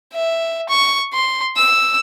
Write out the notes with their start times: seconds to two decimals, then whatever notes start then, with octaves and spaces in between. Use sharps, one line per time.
0.14 E5
0.69 C#6
1.13 C6
1.57 E6